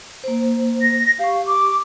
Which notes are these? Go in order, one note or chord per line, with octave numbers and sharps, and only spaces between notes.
A#3 C5
A#6
G4 F5 C#6
D6